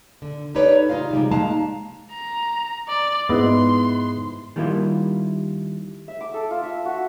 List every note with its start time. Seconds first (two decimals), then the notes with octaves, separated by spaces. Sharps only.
0.22 D3
0.55 D#4 G4 A4 B4 C#5 D5
0.89 C#3 D#4 F4 F5
1.11 C3 G3 G#3
1.31 G#3 A#3 D#4 F5 A5 A#5
2.12 A#5
2.88 D5
3.29 G#2 B3 E4 D#5 C6
4.56 D#3 G3 A#3 E4 F4
6.08 E5
6.21 D6
6.34 A4
6.51 F4
6.63 E5
6.85 F#4